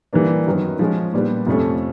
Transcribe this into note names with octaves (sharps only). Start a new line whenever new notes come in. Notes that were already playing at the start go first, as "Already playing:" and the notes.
E3 G3 A#3 D4
F#2 D#3 F#3 B3
F3 G#3 C#4
A#2 G3 B3 D4
F2 C3 F3 A3 C#4